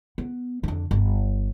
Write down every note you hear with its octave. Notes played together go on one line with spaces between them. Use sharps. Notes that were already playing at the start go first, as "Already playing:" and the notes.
B3
F2 D3
G1